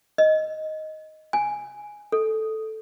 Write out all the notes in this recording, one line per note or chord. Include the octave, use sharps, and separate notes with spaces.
D#5
G#5
A4